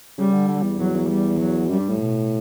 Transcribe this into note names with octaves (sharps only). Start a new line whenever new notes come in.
C#3 G3
D3
D3
E2
E2 F#3
E2
G3
F#3
F#2 G3
G2
A2
B2